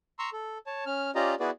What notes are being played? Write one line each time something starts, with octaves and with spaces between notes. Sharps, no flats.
A#5 C6 C#6 E6
A4
C#5 A5
C#4 F6
C#4 F4 G4 D5 D#5 A#5
B3 E4 F#4 G#4 B4 D5